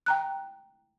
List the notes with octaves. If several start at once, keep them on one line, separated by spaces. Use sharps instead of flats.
G5 A#5 F#6